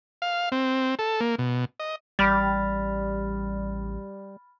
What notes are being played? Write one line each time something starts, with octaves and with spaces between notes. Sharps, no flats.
F5
C4
A4
A#3
B2
D#5
A1 G3 B5 F6 A6